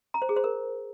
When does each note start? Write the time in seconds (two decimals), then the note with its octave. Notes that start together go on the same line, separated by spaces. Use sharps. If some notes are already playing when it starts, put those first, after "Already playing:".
0.14 A#5
0.22 C5
0.29 G#4
0.36 C5
0.44 A#4